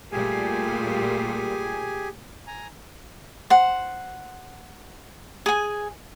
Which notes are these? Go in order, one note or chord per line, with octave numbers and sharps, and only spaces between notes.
A#2 G3 A3 G4 G#4 G#5
G#5 A#5
C5 F#5
G#4 G#5